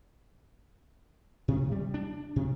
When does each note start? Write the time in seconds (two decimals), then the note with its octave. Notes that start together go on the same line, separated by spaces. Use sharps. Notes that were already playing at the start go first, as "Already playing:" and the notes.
1.48 C3
1.72 G3
1.94 D4
2.36 C3